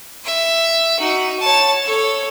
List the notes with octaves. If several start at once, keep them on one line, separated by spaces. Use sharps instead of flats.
E5
D#4 F#4
C#5 A5
A4 C#5